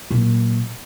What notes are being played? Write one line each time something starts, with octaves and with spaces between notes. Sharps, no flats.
A#2 F#3